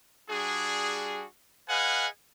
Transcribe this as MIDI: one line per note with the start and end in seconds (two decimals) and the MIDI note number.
0.30 1.25 55
0.30 1.25 62
0.30 1.25 66
0.30 1.25 68
1.69 2.08 68
1.69 2.08 71
1.69 2.08 75
1.69 2.08 77
1.69 2.08 78
1.69 2.08 80